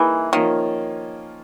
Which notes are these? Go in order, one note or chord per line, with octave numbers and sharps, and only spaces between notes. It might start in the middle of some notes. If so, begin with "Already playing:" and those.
Already playing: E3 A#3 D#4 G#4
D#3 F3 A#3 C#4 F4